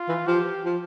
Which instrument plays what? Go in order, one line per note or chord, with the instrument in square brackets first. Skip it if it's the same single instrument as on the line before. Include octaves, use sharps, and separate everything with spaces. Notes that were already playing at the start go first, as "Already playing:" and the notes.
Already playing: [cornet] F4
[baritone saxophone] E3
[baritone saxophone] F3 [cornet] G4
[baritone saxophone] F3